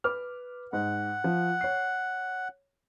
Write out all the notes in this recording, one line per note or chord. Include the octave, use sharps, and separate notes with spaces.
B4 D6 F6
G#2 F#5
F3
C#5 C7